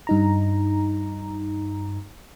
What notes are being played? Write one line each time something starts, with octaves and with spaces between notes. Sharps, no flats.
G2 D#4 A#5